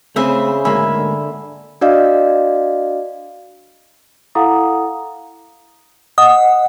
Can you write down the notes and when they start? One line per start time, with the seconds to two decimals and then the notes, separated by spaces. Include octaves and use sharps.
0.16 C#3 A3 C4 G#4 C5 E5 B5
0.65 D2 G#2 A#3 E5 G#5 B5
0.95 D3
1.81 D4 F#4 D5 D#5 F5
4.35 E4 A4 F5 F#5 A#5 D#6
6.18 D#5 F#5 D#6